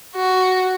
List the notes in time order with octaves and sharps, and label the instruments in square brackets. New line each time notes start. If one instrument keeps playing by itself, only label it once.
[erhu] F#4